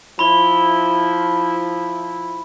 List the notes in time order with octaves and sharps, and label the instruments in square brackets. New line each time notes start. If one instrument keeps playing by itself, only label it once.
[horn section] F3 E4 [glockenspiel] B5 C6 G7